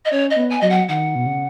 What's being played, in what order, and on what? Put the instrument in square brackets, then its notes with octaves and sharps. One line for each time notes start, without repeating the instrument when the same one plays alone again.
[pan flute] D#5
[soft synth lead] C#4 [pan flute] C#5
[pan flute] D#5
[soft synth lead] B3
[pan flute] G#5
[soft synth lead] F#3 [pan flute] D#5
[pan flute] F#5
[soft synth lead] D#3 [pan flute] F#5
[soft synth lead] B2
C#3